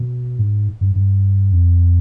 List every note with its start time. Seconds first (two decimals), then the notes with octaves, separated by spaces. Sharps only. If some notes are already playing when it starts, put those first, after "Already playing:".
Already playing: B2
0.39 G#2
0.81 G2
0.96 G2
1.52 F2